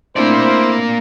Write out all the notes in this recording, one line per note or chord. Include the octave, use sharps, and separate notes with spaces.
A3 A#3 C4 D4 E4 C5 D5